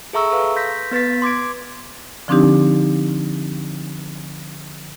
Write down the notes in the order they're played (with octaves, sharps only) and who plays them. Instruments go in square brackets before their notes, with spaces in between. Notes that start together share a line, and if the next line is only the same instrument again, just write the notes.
[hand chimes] G#4 A4 E5 A#5 C#6 E6
A4 B4 F5
C6 G6 A#6 B6
B3 B4 A6 B6
C6 D6 G#6 D7
[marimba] D3 F3 C4 D4 D#4 G4